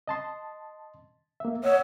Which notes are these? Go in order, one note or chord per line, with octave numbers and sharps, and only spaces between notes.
D#5 A5 C6
A#3 E5
C#5 D#5 F#5 E6